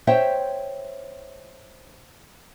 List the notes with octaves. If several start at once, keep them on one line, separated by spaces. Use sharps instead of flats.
C5 C#5 E5 G5